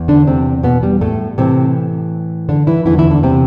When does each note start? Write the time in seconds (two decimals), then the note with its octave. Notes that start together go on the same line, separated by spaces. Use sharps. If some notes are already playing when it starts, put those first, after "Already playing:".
Already playing: E2
0.08 D3 D4
0.27 C3 C4
0.63 B2 B3
0.83 G3
1.01 A2 A3
1.38 A2 C3 E3 C4
2.49 D3 D4
2.67 E3 E4
2.86 E2 D3 E3 E4
2.98 E3 E4
3.10 D3 D4
3.23 C3 C4